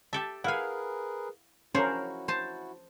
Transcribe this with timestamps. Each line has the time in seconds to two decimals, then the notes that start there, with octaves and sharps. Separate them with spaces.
0.13 G4 A4 E5 A5
0.44 E4 G#4 A#4 B4 F5 F#5 G#5
1.75 F3 C#4 E4 F#4 G#4 A#4 C5 C#5
2.28 C5 A5